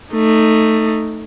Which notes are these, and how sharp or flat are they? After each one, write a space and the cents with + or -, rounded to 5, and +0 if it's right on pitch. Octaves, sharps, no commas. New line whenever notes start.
A3 +10 D#4 -5